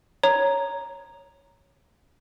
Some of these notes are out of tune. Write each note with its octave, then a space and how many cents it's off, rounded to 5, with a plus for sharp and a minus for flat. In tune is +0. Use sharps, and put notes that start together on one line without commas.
C#5 +0 A#5 +0